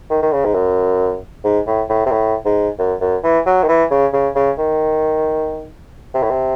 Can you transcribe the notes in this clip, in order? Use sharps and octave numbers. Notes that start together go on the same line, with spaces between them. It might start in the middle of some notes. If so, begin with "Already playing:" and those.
D#3
D#3
C#3
G#2
F#2
G#2
A2
A2
C3
A2
G#2
F#2
F#2
E3
F#3
D#3
E3
C#3
C#3
C#3
D#3
C3
A2
C3